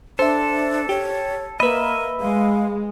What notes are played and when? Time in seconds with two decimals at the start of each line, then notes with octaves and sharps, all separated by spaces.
0.19 D4 A4 C5 E5
0.89 G4 C#5
1.60 A#3 B4 D#5 E5 B5
2.21 G#3 F5